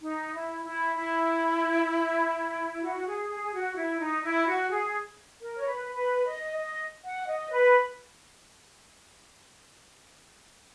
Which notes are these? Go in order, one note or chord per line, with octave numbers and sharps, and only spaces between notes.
D#4
E4
E4
E4
F#4
G#4
G#4
G#4
F#4
E4
D#4
E4
F#4
G#4
A#4
C#5
B4
B4
D#5
D#5
F#5
D#5
B4